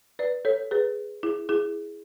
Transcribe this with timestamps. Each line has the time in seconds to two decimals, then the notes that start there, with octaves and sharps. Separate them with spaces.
0.19 B4 D5
0.45 A4 C#5
0.71 G#4 B4
1.23 E4 G#4
1.49 E4 G#4